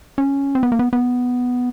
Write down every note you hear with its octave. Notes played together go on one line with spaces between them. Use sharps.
C#4
C4
B3
A#3
B3
B3